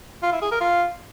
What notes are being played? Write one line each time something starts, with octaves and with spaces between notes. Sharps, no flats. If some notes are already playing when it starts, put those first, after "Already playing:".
F4
E4
G#4
A#4
F4